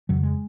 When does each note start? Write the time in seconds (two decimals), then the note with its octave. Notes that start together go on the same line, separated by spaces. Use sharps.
0.09 F2 C#3 F#3
0.23 G#3